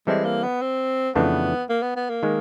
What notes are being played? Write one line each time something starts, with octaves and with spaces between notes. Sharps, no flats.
E3 G3 G#3 C4 E4 A4
A#3
B3
C4
F2 C#3 E3 A3 B3 D4
A#3
B3
B3
A#3
D#3 G#3